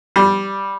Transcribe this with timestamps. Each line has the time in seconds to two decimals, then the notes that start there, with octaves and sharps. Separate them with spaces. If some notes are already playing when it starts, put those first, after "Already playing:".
0.16 G3